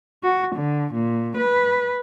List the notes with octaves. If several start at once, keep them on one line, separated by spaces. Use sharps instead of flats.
F#4
D3
A#2
B4